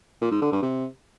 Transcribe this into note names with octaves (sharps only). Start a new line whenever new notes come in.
A#2
G#2
D3
G2
C3